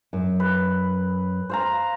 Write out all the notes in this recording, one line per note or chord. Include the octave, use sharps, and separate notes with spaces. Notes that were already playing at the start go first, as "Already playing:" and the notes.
F#2
B4
C5 F5 A#5